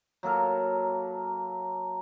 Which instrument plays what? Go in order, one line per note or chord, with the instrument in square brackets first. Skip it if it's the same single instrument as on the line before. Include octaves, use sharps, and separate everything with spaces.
[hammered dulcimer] F#3 A#3 A4 A#4